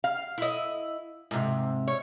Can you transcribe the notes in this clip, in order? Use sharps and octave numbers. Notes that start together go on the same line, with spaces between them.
F5
E4 D#5
G#2 C3
C#5